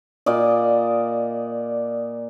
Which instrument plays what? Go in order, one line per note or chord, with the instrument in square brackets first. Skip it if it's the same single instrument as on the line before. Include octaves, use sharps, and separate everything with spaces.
[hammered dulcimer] A#2 D5 D#5